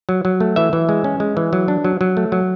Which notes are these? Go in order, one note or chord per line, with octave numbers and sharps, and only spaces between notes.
F#3
F#3
A3
E3 E5
E3
G#3
C#4
G#3
E3
F#3
D4
F#3
F#3
A3
F#3